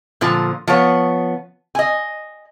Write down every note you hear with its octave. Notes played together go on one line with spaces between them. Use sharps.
A#2 D3 F3
F3 B3 C#5
D#5 G#5